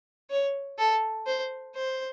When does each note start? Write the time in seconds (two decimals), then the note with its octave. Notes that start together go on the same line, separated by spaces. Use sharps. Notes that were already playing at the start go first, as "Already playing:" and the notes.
0.30 C#5
0.78 A4
1.26 C5
1.75 C5